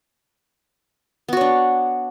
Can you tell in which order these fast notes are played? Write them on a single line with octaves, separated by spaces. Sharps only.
B3 F#4 C#5 D4